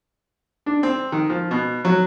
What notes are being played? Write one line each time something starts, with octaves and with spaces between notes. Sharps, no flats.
D4
C4
D#3
F3
B2
F#3